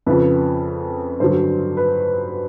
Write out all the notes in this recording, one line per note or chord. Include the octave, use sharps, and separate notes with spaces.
F2 C#3 F3 B4
G2 D3 F#3 C5
B4